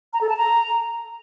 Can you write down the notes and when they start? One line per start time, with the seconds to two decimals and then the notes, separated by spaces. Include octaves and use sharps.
0.13 A#5
0.21 A4
0.29 A5
0.37 A#5